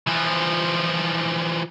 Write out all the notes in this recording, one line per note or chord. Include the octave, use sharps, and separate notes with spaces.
E3 F3